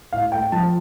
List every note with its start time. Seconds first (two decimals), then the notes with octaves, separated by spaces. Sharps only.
0.13 A2 F5
0.32 A3 G5
0.52 F3 A5